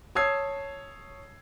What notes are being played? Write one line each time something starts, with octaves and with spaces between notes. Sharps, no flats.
C#5 A5 D#6 E6 G#6 C7